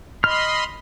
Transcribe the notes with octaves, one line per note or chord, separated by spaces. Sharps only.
D#5 B5 C6 F6